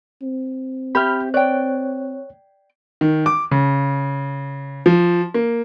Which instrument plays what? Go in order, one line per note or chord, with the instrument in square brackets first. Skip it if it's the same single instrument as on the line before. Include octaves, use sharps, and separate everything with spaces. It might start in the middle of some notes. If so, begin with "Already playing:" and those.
[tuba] C4
[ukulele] G4 C5 E5 [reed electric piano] B5 F6
[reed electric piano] C#5 F#6 [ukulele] D5 G5
[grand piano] D#3
D6
C#3
F3
A#3